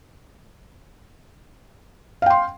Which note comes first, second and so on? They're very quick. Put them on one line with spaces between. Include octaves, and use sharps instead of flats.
F5 G5 C6